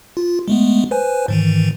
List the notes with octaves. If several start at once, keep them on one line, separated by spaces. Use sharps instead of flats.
F4
G#3 A3 B3
B4 C5 G#5
G#2 D#3 E3